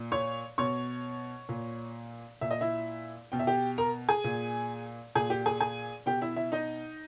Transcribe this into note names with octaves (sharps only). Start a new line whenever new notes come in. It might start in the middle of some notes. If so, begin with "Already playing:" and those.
Already playing: A#2
C#5 C#6
B2 C#5 C#6
A#2
A#2 E5
D#5
E4 E5
B2 G5
E5
G4 G5
A#4 A#5
G#4 G#5
A#2
A#2 G#4 G#5
G4 G5
G#4 G#5
G#4 G#5
B2 G4 G5
E4 E5
E4 E5
D#4 D#5